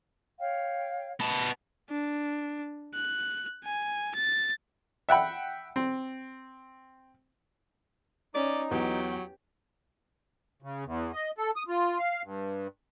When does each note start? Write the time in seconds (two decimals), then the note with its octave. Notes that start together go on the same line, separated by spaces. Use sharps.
0.39 C#5 F5 G5
1.20 B3 A5
1.89 D4
2.94 F#6
3.64 G#5
4.15 A6
5.09 E5 F#5 G5 B5
5.76 C4
8.34 C#4 D#4 D5
8.71 E2 F#3 G4
10.62 C#3
10.85 E2
11.13 D#5
11.38 A4
11.56 D#6
11.68 F4
11.99 F5
12.23 G2